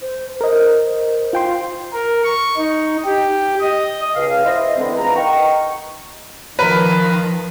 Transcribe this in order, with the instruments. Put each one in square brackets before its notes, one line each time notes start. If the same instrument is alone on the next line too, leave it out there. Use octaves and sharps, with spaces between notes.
[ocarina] C5
[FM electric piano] A#4 D#5 [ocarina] C5
[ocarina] C5
[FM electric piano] F4 G5 C6
[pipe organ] A#4
C#6
D#4
G4
D#5
[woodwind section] C#2 F5
E4 C5 D#5
D3 E3 G#3 C4
E3 F4 G#4 B4 A#5
D#4 A#4 F#5 G5 C#6
[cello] D#3 F3 [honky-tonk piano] A#4 B4